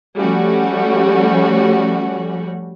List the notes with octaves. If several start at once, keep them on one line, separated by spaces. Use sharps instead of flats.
F3 G3 A3 C#4 F#4